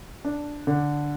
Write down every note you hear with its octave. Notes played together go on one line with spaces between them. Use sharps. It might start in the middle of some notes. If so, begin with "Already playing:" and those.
D4
D3